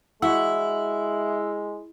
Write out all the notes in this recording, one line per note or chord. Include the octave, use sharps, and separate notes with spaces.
G#3 E4 F#4 E5 F#5 E6